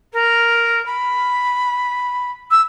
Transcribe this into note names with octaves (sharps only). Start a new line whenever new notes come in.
A#4
B5
E6